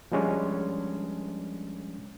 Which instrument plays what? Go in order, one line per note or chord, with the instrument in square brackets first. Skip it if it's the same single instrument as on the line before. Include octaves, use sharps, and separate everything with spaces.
[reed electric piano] F3 G3 G#3 C#4 D4